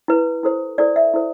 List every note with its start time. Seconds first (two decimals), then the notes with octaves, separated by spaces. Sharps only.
0.08 E4 B4
0.43 E4 A4 C5
0.78 E4 A4 C5 D5
0.96 E5
1.14 E4 A4 C5